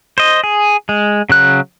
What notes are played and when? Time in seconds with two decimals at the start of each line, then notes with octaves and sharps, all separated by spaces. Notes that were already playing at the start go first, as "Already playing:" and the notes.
0.18 C5 D#5
0.44 G#4
0.89 G#3
1.29 C#3 F#3 F#6